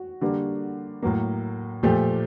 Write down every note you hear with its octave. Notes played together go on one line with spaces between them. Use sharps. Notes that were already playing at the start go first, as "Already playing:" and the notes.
Already playing: F#4
D3 G3 A#3
A2 F#3 A#3
A#2 F3 A3 G4